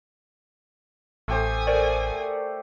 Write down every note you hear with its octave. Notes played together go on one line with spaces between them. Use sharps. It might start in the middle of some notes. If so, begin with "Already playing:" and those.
A1 A3 G4 C5 G#5 D#6
A3 A#4 C5 D5